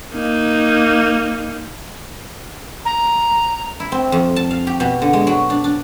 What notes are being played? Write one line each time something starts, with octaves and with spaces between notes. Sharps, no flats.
A#3 D#4
A#5
E4
C4
F2
A5
F5
G4
B2
D3
G#3
F#3
D4
D4